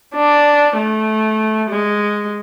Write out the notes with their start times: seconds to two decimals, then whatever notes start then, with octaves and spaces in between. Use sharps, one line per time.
0.15 D4
0.78 A3
1.71 G#3